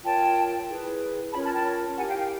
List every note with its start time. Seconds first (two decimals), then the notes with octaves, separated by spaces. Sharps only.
0.04 F4 A#4 C#5 G5 A5
0.69 E4 G#4 B4
1.33 C#4 F4 A#4 C#5 A5 B5
1.44 A5 B5
1.54 G5 A5
1.97 E4 G4 A#4 F#5 G#5
2.08 F5 G5
2.19 F5 G5